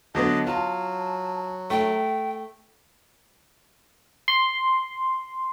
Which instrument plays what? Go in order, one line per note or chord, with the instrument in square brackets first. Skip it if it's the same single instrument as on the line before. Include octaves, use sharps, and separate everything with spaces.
[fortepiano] D3 F#3 B3 [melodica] D#5 A5
[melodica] F#3 [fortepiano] F4 [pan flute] A5
[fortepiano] A3 [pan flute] G5
[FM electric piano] C6